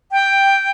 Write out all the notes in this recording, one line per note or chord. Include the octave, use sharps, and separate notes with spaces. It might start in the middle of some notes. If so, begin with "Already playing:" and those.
G5